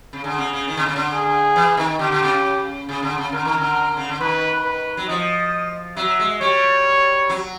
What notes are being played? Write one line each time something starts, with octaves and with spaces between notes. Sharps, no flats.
C#3
D3 G#4
C#3
C#3
D#3
D3
C#3
D3
G#4
E3
D#3
D3 G4
D3
C#3
C#3 G#4
D3
C#3
D3 A#4
D#3
D3
C#3
D3
D#3 B4
B4
F#3
F3 D#5
F#3 E5
G#3
G3 C#5
F#3